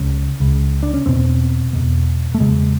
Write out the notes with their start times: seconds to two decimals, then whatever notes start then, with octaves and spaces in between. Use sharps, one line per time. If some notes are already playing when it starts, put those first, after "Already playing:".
Already playing: C#2 C#3 C#4
0.40 C#2 C#3
0.83 D4
0.94 C#4
1.06 E2 B2 C4
1.73 E2 B2
2.34 A3
2.40 E2 C#3 G#3